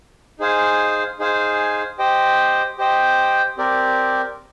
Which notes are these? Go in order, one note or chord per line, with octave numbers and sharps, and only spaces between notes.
D#4 G#4 C5 F5 G#5
D#4 G#4 C5 F5 G#5
G4 C5 D#5 G5
G4 C5 D#5 G5
C4 G4 A#4 D5